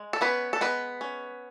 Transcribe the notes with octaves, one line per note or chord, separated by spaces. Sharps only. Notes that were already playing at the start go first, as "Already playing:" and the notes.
Already playing: G#3
A4
B3 C#4 B4
A4
G#3 B3 B4
C#4